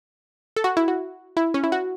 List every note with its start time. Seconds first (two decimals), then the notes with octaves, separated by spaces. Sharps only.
0.56 A4
0.64 F#4
0.77 E4
0.88 F#4
1.37 E4
1.54 C#4
1.64 E4
1.72 F#4